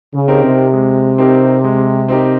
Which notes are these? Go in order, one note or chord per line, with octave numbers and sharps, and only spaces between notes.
C#3
C4 D#4 G4 A#4
C3
G#3
C4 D#4 G4 A#4
G#3
C4 D#4 G4 A#4